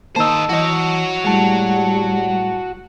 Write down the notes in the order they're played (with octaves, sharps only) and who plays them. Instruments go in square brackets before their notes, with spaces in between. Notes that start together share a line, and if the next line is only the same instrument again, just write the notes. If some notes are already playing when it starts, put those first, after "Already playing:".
[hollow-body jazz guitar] D#3 A#3 [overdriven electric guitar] C5 D#5 [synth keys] A5 E6
[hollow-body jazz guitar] E3 D#5 [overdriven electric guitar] F#4 C#5
[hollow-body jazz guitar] A2 G#3 [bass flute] G3 [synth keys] F#5 A5